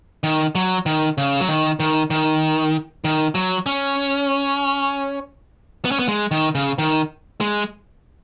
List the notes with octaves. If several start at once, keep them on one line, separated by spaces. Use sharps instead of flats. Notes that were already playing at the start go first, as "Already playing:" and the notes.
D#3
F#3
D#3
C#3
F#3
D#3
D#3
D#3
D#3
F#3
C#4
B3
C#4
B3
G#3
D#3
C#3
D#3
G#3